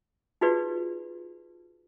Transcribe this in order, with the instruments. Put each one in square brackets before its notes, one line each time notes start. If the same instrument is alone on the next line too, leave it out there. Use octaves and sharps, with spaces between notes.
[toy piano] D#4 F4 F#4 G#4 B4 D5